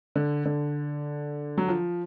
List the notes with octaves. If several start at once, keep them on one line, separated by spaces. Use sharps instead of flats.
D3
D3
F#3
F3